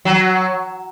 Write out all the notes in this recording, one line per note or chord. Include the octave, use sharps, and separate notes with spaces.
F#3